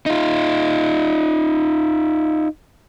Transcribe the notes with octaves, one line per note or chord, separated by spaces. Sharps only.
D#4 F4